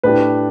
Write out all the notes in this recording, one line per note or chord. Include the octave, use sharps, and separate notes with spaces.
A2 A3 D4 G4 B4